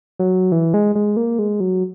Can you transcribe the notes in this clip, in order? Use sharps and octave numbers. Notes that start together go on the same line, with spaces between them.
F#3
E3
G#3
G#3
A#3
G#3
F#3